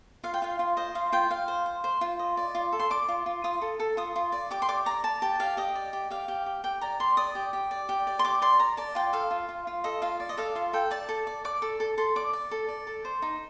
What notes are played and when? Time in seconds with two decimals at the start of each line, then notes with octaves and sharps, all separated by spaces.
0.24 F4 F5
0.34 G5
0.42 F4 F5
0.59 F4
0.77 C5 D#5
0.95 F4 F5
1.12 F4 G5
1.30 F4 F5
1.48 C5
1.66 C5
1.84 C5
2.01 F4
2.19 D#5
2.37 D5
2.55 F4
2.72 A4
2.79 C6
2.90 D5 D6
3.09 F4
3.26 F4
3.44 F4 D#6
3.61 A4
3.80 A4
3.97 F4 D#6
4.16 F4
4.32 D5
4.51 G4 D6
4.62 C6
4.68 D5 D6
4.86 D5 A#5
5.04 D5 A5
5.22 G4 A5
5.40 G4 F5
5.57 G4 D#5
5.75 D5
5.93 G4
6.10 G4 F5
6.28 G4
6.46 G4
6.64 G4 G5
6.81 D5 A#5
7.00 G4 C6
7.17 D5 D#6
7.35 G4
7.53 G4
7.71 D5
7.89 G4
8.07 D5
8.19 C6
8.24 G4 D6
8.42 D5 C6
8.59 D5 A#5
8.77 D5 A5
8.95 F4 G5
9.13 A4 F5
9.31 F4
9.49 F4
9.67 F4
9.84 A4 D#5
10.02 F4 F5
10.20 D5
10.29 D#5
10.37 A4 F5
10.55 F4 F5
10.73 A4 G5
10.91 D5 A5
11.09 A4
11.27 D5
11.45 D5 D6
11.62 A4
11.80 A4
11.97 A4 C6
12.16 D5 D6
12.33 D5
12.51 A4
12.68 D5
12.87 A4
13.05 C5
13.22 D#4